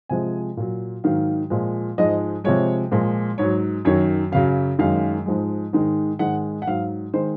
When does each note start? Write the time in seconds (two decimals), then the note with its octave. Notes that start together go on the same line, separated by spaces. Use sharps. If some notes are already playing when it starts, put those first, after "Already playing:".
0.09 C3 F3 G#3 G#5
0.57 A#2 F#3
1.04 G#2 D#3 F#3 F5
1.50 A#2 F3 G#3
1.98 G#2 F3 G#3 D#5
2.44 C3 F3 G#3 C#5
2.91 A#2 F3 G#3
3.38 G#2 F#3 C#5
3.85 F#2 D#3 F#3 C#5
4.32 F#2 C#3 F#3 F5
4.79 F#2 D#3 G#3 F5
5.26 G#2 F3 G#3
5.73 G#2 D#3 G#3
6.19 G#2 D#3 G#3 F#5
6.62 F#5
6.67 G#2 F#3 F5
7.14 D#3 G#3 C5